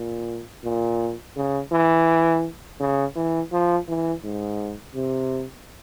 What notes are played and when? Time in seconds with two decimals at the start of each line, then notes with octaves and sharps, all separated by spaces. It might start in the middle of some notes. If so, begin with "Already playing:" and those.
Already playing: A#2
0.64 A#2
1.36 C#3
1.72 E3
2.80 C#3
3.15 E3
3.52 F3
3.88 E3
4.24 G#2
4.95 C3